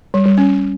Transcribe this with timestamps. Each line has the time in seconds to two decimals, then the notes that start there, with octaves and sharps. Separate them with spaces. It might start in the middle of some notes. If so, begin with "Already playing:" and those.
0.14 G3
0.26 G3
0.38 C#4